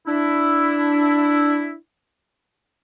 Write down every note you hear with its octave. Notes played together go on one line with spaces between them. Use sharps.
D4 E4